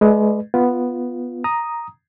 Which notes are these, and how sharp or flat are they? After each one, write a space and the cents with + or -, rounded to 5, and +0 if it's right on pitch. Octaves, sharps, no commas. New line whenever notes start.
G#3 +35 B4 +0 D5 +45
B3 +0 F4 +0
A#5 +5 D#6 +0